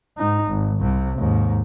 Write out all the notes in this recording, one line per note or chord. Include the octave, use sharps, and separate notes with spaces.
G#2 D#4
G#1
C2 C3
D#2 G#2